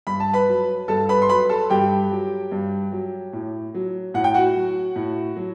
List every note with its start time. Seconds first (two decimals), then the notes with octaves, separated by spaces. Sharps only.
0.07 G2 B5
0.20 A5
0.33 B4 B5
0.48 F#3
0.88 G2 A4 A5
1.09 B4 B5
1.22 C6
1.29 F#3 B4 B5
1.49 A4 A5
1.70 G2 G4 G5
2.11 F#3
2.52 G2
2.92 F#3
3.33 A2
3.74 F#3
4.14 A2 F#5
4.24 G5
4.34 F#4 F#5
4.55 F#3
4.96 A2
5.36 F#3